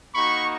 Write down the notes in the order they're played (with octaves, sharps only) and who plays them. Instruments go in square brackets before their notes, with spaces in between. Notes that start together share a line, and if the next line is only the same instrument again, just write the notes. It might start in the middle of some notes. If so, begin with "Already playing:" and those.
[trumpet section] A#3 D#4 F#4 B5 C#6